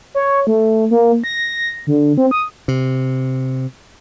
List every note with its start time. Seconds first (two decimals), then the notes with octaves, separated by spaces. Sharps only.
0.15 C#5
0.47 A3
0.91 A#3
1.24 A#6
1.87 D3
2.18 C4
2.31 D#6
2.68 C3